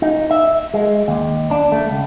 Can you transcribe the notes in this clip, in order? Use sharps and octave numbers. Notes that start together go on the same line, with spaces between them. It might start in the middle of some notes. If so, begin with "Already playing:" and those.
D#4
E5
G#3
D#2
D4
A3
C#2